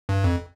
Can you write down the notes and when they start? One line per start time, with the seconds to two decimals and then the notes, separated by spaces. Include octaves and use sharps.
0.09 G2
0.24 F2